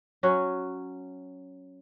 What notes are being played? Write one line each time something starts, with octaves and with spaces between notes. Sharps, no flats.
F#3 C#4 F#4